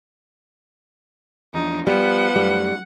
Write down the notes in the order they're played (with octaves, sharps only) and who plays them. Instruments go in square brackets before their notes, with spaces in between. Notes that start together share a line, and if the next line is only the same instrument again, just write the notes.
[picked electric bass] E2 F3 D4 [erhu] D#4
[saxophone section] F3 B4 [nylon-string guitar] G3 [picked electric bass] B3 [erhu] F#5
[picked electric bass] F#2 A3 [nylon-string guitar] G3